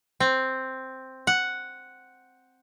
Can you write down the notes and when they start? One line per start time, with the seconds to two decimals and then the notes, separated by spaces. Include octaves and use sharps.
0.20 C4
1.27 F#5